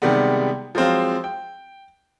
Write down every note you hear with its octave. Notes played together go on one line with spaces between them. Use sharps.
C3 D#3 G3 G#3 B3
F3 F#3 G#3 C4 F4
G5